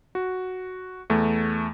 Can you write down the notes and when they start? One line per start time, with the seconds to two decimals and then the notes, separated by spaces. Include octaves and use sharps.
0.15 F#4
1.10 E2 A3